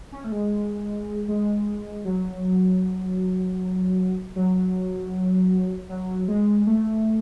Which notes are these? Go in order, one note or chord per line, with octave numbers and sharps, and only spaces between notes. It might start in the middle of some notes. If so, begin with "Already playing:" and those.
C#4
A3
G#3
G#3
F#3
F#3
F#3
G#3
A3